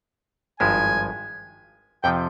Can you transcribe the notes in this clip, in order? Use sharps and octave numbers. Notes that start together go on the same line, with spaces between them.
G#1 G2 F3 G#3 E4 G#5
F2 C3 F3 G5